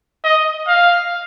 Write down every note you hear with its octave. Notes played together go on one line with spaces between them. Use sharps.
D#5
F5